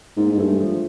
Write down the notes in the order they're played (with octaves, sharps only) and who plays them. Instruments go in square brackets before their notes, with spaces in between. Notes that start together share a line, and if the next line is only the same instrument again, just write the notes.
[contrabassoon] G#2 [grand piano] A#3
[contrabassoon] G#2 [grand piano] G#3
[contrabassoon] G2 [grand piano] A3
[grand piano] F3